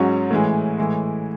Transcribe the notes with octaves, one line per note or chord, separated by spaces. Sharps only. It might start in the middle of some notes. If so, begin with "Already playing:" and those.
Already playing: G#2 F#3 C#4 F#4
A2 E3 G#3
A2 E3 G#3